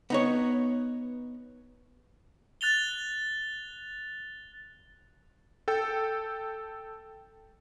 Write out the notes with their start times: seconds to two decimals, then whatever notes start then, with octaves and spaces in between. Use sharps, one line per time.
0.10 B3 D#4 C#5
2.61 F#6 A6 F7 G7
5.68 A4 G5